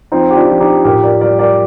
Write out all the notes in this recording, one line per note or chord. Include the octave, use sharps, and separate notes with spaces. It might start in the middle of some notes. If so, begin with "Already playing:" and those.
F3 C4 D#4
G4
D4 F4
F3
D#4 G4
A2 G4 A#4
A#4 D5
G3 A#4 D5
A#4 D5